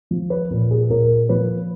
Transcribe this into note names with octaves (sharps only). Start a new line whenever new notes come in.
F3
B4
A#2
G#4
A#2 A#4
F3 B4